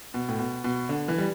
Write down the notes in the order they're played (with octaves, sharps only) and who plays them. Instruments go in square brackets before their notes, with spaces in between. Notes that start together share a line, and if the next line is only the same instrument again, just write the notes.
[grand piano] B2
A2
B2
B2
D3
E3
G3